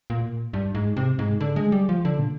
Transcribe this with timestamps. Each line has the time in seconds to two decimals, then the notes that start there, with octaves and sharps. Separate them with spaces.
0.10 A#2
0.53 G2
0.75 G#2
0.97 C3
1.19 G#2
1.40 D3
1.56 G#3
1.72 G3
1.89 F3
2.05 D3
2.19 A#2